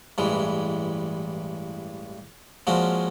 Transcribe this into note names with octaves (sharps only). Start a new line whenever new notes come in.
A1 G2 E3 G#3
A#2 F3 G#3 C#4 F#4